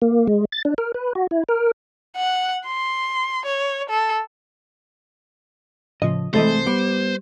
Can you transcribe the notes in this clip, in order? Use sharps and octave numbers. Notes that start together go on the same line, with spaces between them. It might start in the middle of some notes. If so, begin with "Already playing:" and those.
A#3
G#3
A6
D4
A#4
B4
F#4
E4
A#4
F#5
C6
C#5
A4
A2 C#3 F3 D#5
C2 E3 G#3 A3 C4 A4 C5 D#5
G3 B3 D6